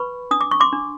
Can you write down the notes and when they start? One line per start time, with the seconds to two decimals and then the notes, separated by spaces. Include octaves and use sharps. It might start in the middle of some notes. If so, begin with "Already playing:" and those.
Already playing: B4 B5 C#6
0.31 D4 D#6
0.41 D6
0.51 C#6
0.60 C6 D6
0.72 D4